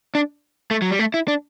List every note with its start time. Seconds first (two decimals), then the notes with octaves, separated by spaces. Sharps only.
0.15 D4
0.71 A3
0.82 F#3
0.91 G3
0.99 A3
1.14 E4
1.28 D4